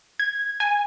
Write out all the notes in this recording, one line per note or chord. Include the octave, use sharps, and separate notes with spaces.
G#6
G#5